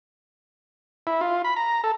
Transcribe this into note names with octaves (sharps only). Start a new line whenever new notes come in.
E4
F4
B5
A#5
A4